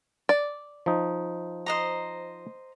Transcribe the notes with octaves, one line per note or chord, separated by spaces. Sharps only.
D5
F3 D#4
C5 D#5 A#5